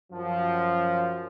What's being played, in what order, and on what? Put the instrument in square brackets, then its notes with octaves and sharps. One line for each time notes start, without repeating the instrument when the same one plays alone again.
[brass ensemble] F#2 F3